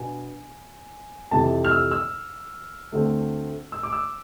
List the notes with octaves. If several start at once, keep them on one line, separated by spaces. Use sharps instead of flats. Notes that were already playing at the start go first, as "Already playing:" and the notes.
Already playing: B2 B3 D4 G#5
F2 C3 E3 A5
F6
E6
E6
D2 D3 A3 C4
E6
D6
E6